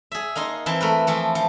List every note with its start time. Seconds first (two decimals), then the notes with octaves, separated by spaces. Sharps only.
0.12 G#4 E5
0.36 A#3 D#4 D#5 C6
0.66 E3 C4 A5
0.81 A3 A#4 B4
1.07 E3 F3 A3
1.35 F3